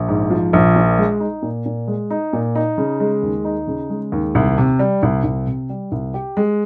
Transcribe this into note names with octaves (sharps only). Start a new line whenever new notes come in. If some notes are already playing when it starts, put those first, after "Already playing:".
Already playing: A#1
G#2
F3
A#1
A#2
G#3
D#4
A#2
A#2
G#3
D#4
A#2
D#4
C#3
G#3
D#2
D#4
C#3
G#3
D#2
C2
C3
G3
C2
C2
C3
G3
C2
G4
G#3